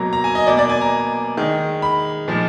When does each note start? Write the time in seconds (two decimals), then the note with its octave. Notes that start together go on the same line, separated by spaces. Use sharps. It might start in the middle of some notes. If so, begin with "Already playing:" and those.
Already playing: B2 F#3 A#3 A#5
0.13 A#5
0.24 G#5
0.35 D#5
0.46 B2 A#3 D5
0.59 D5
0.69 G#5
0.81 A#5
1.37 D#3 G#3
1.82 B5
2.28 A#2 F3 G#3